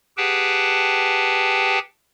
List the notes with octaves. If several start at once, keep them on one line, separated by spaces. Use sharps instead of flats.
G4 G#4 B4 F#5 G5 A5